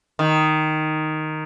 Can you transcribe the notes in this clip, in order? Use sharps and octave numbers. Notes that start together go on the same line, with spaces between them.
D#3